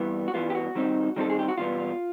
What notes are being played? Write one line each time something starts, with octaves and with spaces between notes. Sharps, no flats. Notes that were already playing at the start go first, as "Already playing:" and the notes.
Already playing: G2 E3 G3 B3
F#4
G2 E3 G3 B3 F4
G4
F#4
D#3 G3 C4 D#4
D#3 G3 C4 D#4 A4
G#4
G4
F#4
E2 B2 G3 B3 F4